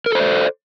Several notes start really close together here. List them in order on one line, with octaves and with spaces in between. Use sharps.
A#4 A4 C5 D5